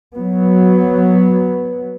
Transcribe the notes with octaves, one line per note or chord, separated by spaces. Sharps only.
F#3 B3